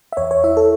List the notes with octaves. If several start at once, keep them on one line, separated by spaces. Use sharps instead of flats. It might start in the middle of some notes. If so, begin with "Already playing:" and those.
E5
E2 C#5
C#5
E4 E5
A4